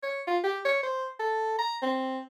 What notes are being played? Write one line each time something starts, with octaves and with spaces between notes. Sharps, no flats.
C#5
F4
G4
C#5
C5
A4
A#5
C4